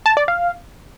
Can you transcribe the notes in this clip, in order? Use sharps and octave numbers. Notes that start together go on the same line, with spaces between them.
A5
D5
F5